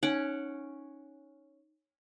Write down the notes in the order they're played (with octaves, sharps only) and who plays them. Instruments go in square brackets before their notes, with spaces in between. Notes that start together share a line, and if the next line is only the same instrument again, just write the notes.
[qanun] C#4 F#5 [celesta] D#4 D7